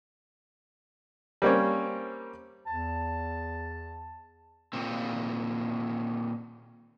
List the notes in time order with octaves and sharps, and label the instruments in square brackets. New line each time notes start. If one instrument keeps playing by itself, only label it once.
[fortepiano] G3 A#3 C4 C#4
[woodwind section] E2 A5
[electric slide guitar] A#2 D#3 C4